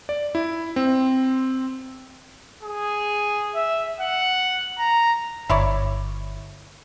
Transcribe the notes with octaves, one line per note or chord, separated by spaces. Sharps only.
D5
E4
C4
G#4
E5
F#5
A#5
G1 E4 C#5 D5